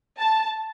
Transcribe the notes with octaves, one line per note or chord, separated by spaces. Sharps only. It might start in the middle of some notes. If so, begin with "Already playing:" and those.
A5